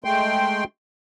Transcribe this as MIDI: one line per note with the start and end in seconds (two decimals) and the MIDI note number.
0.04 0.64 56
0.04 0.64 57
0.04 0.64 79
0.04 0.64 84